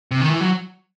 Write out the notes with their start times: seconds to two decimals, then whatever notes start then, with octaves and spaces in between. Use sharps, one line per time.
0.11 C3
0.21 D#3
0.30 E3
0.41 F#3